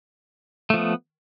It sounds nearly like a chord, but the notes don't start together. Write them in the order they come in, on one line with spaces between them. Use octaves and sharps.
A3 F3 B3